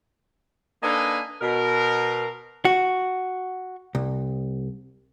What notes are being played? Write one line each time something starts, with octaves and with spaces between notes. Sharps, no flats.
A#3 D4 D#4 A4 B4 G#5
B2 A#4
F#4
C2